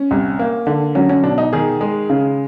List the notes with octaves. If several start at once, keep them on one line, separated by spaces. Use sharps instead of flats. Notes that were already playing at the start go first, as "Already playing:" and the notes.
Already playing: C#4
C2
A#3
D3
F#3 C#4
C#4
B2 D4
D#4
D#3 G#4
G#3
C#3